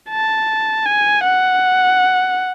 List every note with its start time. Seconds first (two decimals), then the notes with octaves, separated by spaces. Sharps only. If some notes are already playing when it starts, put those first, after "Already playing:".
0.10 A5
0.85 G#5
1.24 F#5